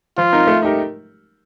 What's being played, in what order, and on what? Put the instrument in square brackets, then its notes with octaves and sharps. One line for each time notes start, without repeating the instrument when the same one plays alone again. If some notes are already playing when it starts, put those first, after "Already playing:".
[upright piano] F3 [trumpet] F4
[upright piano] C4 D#4 A#4
A3
D#4 G4 A#4